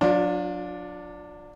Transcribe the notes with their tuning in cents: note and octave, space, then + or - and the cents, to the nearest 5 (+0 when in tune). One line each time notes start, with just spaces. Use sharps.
F#3 -30 D4 +0 F4 +30